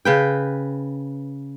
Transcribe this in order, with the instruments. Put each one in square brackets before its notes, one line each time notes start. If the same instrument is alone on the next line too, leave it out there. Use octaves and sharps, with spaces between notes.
[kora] C#3 B4 G5